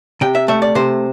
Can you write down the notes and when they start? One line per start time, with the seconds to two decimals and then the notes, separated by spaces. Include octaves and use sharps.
0.21 C3 G5
0.35 E5
0.48 A3 E5
0.62 D5
0.75 C3 C5